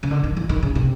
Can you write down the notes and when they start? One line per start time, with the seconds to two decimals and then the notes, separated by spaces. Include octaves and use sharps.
0.03 C#3
0.11 D3
0.24 D#3
0.37 E3
0.49 D#3
0.63 C#3
0.75 C3